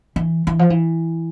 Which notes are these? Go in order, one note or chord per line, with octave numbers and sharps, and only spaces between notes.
E3
E3
F3
E3